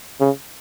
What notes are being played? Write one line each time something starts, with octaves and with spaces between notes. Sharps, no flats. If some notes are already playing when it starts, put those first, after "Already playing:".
C#3